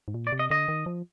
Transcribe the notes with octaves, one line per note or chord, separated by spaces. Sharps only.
G#2
A#2
D5
C3
D#5
D3 D#5
D#3
F3